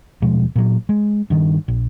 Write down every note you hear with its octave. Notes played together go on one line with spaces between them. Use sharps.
D#1 B2 F3 G#3
A#2 F#3
G#3
G2 D#3
A#1